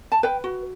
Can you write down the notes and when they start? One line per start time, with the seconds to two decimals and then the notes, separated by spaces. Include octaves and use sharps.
0.12 A5
0.23 B4 G5
0.44 F#4